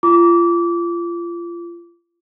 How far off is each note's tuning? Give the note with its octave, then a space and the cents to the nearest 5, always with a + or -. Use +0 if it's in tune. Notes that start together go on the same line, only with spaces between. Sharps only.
F4 -30 D6 -25